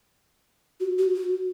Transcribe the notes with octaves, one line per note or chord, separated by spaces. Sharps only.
F#4
F#4
F#4